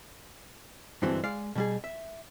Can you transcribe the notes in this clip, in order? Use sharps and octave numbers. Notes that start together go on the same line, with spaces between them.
G2 D3 E3 G#3 C4 F#4
G#3 D5 F5
B2 G3 G#4
E5